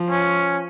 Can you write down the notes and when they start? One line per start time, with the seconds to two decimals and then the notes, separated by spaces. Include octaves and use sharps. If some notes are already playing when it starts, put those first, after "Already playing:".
Already playing: F3
0.10 C#4